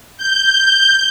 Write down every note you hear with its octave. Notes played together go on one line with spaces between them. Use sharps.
G6